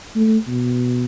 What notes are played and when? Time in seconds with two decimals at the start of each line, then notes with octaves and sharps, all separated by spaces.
0.16 A3
0.48 B2